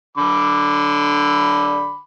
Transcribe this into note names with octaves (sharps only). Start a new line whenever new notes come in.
D3 B5 D6